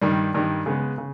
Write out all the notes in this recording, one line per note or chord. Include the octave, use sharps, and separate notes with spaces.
G2 D#3 G3
G2 D#3 G3
C#3 G#3 B3
C#3